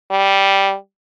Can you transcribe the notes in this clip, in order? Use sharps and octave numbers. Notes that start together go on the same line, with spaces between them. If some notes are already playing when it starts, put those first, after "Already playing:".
G3